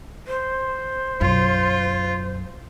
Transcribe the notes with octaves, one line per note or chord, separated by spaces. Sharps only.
C5
B1 F#2 F4